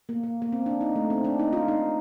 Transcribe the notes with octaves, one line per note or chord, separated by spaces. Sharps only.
A#3
A#3
A#3
C4
D4
D#4
A3
C4
D4
D#4
F4
D#4